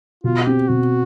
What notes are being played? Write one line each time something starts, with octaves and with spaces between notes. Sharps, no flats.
B2 F4
C4 G4
B2 F#4